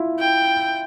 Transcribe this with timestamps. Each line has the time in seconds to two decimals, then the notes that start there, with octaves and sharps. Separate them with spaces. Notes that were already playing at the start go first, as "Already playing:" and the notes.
Already playing: E4 F4
0.19 G5